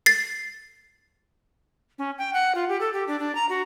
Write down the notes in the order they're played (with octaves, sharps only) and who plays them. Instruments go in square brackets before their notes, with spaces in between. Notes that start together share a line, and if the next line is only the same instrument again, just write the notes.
[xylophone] A6 C7
[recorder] C#4
G5
F#5
F4
G4
A4
G4
D4
D4
A#5
F#4